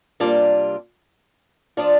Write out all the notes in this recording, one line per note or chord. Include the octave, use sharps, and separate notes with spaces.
C3 G3 A#3 D4 F4 D5
F3 D4 F4 D5